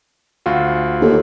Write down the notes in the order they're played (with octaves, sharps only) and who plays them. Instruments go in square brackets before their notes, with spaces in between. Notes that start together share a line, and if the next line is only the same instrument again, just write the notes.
[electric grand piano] D2 F4 F#4
[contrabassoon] D#2 [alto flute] A4